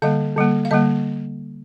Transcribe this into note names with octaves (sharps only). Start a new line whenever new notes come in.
D3 G3 A#3 F5
D3 G3 A#3
F5
D3 G3 A#3 D#5